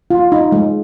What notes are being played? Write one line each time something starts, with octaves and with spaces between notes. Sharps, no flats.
F4
D#4
G#3